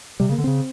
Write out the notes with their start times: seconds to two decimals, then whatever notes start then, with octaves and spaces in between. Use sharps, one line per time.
0.20 C3 G3
0.29 C#3
0.32 A#3
0.38 D3
0.44 C#3 C4